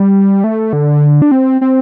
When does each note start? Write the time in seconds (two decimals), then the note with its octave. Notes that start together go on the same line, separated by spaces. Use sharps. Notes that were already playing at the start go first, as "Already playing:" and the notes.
Already playing: G3
0.44 A3
0.73 D3
1.22 D4
1.32 C4
1.61 C4